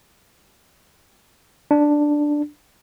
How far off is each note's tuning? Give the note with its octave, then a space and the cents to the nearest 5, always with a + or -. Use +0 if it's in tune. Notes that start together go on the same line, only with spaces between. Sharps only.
D4 +5